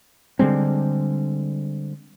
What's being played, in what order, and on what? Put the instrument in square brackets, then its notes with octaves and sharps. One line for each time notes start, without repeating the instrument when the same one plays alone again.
[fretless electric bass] D3 G3 G#3 C4